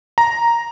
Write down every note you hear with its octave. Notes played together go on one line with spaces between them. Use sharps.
A#5